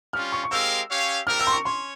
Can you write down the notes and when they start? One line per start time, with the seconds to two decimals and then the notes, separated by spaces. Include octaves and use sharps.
0.13 G3 C#4 F4 F6
0.32 C#6
0.44 C#6
0.51 G#3 C4 G4 A#4 F5 E6
0.90 C#4 G4 C#5 F5
1.27 G3 C4 G4 A#4 F6
1.40 E6
1.47 C6
1.52 C#6
1.65 C#4 C#5 C6